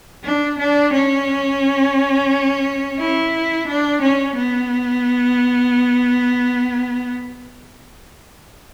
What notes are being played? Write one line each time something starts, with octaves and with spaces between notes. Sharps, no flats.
D4
D4
C#4
E4
D4
C#4
B3